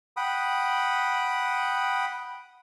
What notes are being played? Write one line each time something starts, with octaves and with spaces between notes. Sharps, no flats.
F#5 G5 B5 D#6